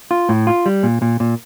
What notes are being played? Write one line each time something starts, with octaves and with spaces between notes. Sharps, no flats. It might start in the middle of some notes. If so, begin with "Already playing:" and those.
F4
A2
F4
G3
A#2
A#2
A#2